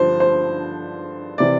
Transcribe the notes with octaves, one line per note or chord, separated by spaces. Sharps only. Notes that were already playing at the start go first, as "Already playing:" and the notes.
Already playing: G2 D3 F3 C5
C5
C3 E3 D5